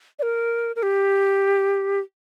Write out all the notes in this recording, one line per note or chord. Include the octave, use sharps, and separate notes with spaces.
D5
A#4
A#4
G4